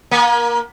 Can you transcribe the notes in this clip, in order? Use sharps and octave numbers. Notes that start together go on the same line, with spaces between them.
A#3